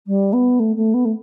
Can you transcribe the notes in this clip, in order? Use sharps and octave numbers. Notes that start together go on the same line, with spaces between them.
G3
B3
A3
A3
B3
A3